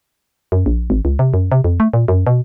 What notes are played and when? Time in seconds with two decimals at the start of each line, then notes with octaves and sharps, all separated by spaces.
0.52 F#2
0.66 A#1
0.90 G#1
1.05 C#2
1.19 C3
1.34 F#2
1.52 C3
1.64 F2
1.80 A3
1.94 A#2
2.08 F#2
2.27 B2